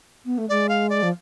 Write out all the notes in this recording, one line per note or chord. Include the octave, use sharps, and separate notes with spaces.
B3
A3
G#3 D5
F5
D5
F3